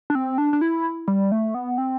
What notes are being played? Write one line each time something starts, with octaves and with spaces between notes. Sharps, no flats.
D4
C4
D4
D4
E4
G3
A3
B3
C4